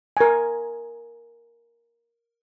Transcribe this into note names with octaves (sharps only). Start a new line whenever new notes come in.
A#4 G#5